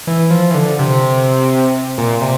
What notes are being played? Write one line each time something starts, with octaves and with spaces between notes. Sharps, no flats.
E3
F3
E3
D3
C3
A#2
C3